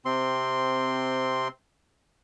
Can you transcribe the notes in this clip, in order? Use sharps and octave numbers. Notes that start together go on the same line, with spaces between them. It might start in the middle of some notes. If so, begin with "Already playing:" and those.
C3 C4 C6